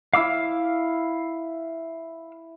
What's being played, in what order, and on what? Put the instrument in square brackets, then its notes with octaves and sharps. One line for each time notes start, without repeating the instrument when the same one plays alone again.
[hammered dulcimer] E4 E5 [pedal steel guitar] F5 D6 E6